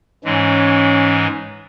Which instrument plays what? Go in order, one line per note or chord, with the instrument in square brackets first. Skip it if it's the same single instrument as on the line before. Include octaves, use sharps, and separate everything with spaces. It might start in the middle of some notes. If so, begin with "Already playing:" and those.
[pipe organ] G#2 E3 G#3 [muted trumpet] C#4